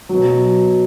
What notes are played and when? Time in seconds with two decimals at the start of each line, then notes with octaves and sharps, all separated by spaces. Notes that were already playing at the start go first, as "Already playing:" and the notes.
0.09 F#3
0.14 B2